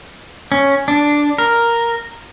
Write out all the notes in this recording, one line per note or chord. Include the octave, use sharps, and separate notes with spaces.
C#4
D4
A#4